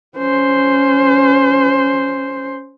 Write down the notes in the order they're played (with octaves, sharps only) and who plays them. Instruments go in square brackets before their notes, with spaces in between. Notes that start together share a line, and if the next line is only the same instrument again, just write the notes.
[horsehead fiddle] C#4 C5